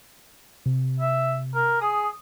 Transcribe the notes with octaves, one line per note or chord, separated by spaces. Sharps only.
C3
E5
A#4
G#4 D#6